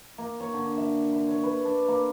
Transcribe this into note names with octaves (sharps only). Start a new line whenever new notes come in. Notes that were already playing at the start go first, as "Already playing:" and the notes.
A#3
C#5
D3
E5
C6
C#5
B4
D4
A#3